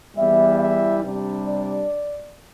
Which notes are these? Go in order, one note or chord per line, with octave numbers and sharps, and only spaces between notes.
E2 E3 G3 E5
E5
C3 G3 D4
D5